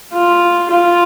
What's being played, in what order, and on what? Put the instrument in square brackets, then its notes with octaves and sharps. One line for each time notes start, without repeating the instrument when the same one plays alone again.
[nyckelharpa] F4
F4